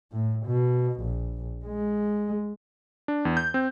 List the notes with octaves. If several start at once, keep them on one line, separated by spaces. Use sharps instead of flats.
A2
B2
A#1
G#3
D4
E2
G6
C4